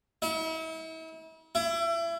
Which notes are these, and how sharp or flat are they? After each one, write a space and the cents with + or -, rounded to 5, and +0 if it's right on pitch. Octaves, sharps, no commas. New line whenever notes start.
E4 -40
E4 +30